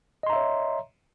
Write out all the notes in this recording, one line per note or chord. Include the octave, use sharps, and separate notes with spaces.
C#5 D#5 E5 A#5 C6